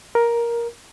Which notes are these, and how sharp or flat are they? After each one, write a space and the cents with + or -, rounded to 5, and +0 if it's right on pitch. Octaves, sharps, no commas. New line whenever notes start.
A#4 +10